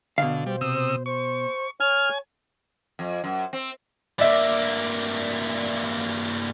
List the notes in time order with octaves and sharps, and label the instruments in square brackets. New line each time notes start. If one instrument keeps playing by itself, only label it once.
[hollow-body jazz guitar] B2 F5 [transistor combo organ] D3
[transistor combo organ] G3 [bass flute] C5
[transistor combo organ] C3 D#6 E6
[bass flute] C5 [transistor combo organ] C#6
[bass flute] C#5 [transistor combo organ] G#5 [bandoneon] F6
[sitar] F2
F#2
C4
[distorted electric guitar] G2 A#3 [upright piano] D5 E5